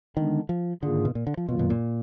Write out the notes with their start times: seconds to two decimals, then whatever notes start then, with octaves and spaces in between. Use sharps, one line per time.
0.16 D3 D#3 G#3 B3 D4
0.49 F3
0.83 G#2 D3 D#3 A#3 F4 G#4
1.05 B2
1.15 A#2
1.27 D3
1.37 F3
1.48 F#2 B2 D#3 F#3 A#3 F4
1.59 B2
1.70 A#2